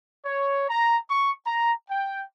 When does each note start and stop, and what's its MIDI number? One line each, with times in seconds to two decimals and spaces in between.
0.25 0.68 73
0.69 0.99 82
1.10 1.31 85
1.46 1.73 82
1.90 2.23 79